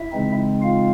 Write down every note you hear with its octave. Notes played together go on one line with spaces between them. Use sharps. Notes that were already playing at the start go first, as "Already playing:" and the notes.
Already playing: E4 E5
C#3 E3 G#3 C4 D#4
F4 F5